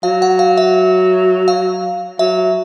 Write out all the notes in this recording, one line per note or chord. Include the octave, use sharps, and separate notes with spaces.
F#3 F5
F#5
F5
E5
F5
F#3 E5